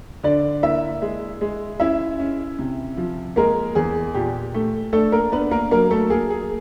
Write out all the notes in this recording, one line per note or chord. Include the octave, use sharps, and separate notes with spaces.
D3 D4 D5
A#3 E4 E5
G#3
G#3
C#4 E4 E5
C#4
C3
F3
G#3 A#3 A#4
E2 G#4
A#2 G4
A3
A3 D4 A4
A#3 A#4
B3 D4 B4
A#3 A#4
F#3 A#3 A#4
A3 A4
A#3 G#4
G#4